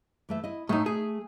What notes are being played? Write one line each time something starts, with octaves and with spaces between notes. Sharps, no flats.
E3 A3 E5
E4 D#5
A2 A3 D#4
G#4